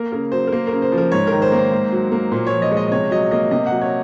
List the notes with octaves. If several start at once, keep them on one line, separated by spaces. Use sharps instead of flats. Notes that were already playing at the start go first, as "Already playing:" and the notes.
Already playing: A#3 A#4
C#3 A#4
F#3 C5
A#4
A#3 C5
A#4
C#3
C5
F3
A#4
G#2 C#5
A#4
D#3
C5
A#3
C5
G#2
F#3
A#3
A#2 C5
C#5
F3
D#5
G#3 C#5
D#5
D#5
C3 C#5
F#3 D#5
A#3 D#5
C3 D#5
F#3 F#5
C#5